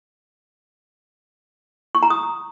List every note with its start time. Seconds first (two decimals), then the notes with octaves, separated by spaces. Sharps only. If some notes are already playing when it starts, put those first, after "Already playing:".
1.95 C#6
2.03 A#5
2.10 D#6